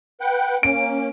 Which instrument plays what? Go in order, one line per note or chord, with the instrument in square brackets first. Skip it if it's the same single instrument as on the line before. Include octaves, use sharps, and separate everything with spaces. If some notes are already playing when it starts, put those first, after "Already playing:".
[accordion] B4 F#5 G5
[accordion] A#3 C#4 [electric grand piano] D7